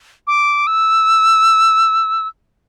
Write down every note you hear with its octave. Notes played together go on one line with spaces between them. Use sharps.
D6
E6